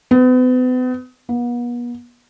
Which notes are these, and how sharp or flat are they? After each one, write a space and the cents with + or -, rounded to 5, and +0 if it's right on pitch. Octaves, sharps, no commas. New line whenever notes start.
B3 +40
B3 -40